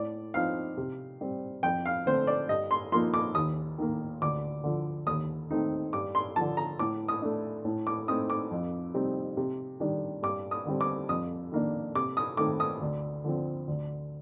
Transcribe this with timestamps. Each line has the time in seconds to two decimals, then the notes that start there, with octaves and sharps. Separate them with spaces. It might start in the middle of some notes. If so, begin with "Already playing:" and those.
Already playing: A2 D5
0.34 F3 C4 D#4 F5
0.77 C3
1.21 G3 C4
1.63 F2 G5
1.86 F5
2.06 D3 A3 C4 C5
2.27 D5
2.49 G2 D#5
2.71 C6
2.92 F3 A#3 D#4 C6
3.14 D6
3.35 D#2 D#6
3.78 D#3 A#3
4.22 D2 D6
4.64 D3 F3
5.07 D#2 D#6
5.50 D#3 A3 C4 D#4
5.93 G2 D6
6.15 C6
6.36 D3 F3 A5
6.57 A#5
6.79 A2 D6
7.08 D#6
7.22 A3 D4
7.65 A2
7.87 D6
8.08 A3 C4 D#4 D#6
8.30 D6
8.51 F2
8.94 C3 G3 C4 D#4
9.37 C3
9.80 D#3 G3 D4
10.23 G2 D6
10.51 D#6
10.65 D3 G3 C4
10.81 D6
11.09 F2 D#6
11.52 D#3 A#3 D4
11.95 C3 D6
12.17 D#6
12.37 D#3 A3 C4 D6
12.60 D#6
12.81 D2
13.24 D3 F3 C4
13.68 D2